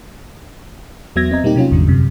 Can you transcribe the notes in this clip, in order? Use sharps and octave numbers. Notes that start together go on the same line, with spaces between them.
E2 F#3 B3 E5 G#6 A#6
C4 D#5 A#5
B2 G3 A#3 D#4 G4
C3 F#3 C#4 F4
G#1 E2 G#2 D3 G3
F#2 C3